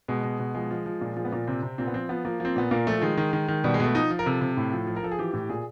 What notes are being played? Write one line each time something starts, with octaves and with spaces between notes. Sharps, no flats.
B2 G#3
B2
B2
F3 G#3
F3
F3
A#2
F3 G#3
B3
A#2 A#3
C3 C4
C3
A#2 C4
B3
F3 C4
F3 B3
F3 A#3
F3 C4
A#2 B3
A#2 A#3
F3 A3
D#3 G#3
D#3
D#3
D#3
B2 G3
G#3
B2 A3
F3 D#4
F3
A#4
C3 A4
C3
A2
F3
F3
A#4
F3 A4
G#4
E3 G4
A2
A#2 G#4